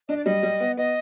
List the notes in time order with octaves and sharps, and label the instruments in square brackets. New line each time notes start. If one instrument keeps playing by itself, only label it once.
[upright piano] D4 [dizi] D#5
[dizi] D5
[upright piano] G3 [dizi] D#5
[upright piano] G3
B3
[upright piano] B3 [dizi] D#5